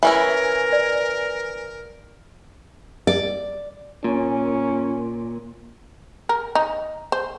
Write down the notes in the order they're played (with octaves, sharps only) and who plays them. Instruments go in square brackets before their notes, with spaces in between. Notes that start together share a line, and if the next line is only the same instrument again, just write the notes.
[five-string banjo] E3 C#4 E4 [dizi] A#4
[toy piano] D5
[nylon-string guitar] D5
[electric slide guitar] A#2 [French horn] C#4
[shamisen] A#4
D#4
C5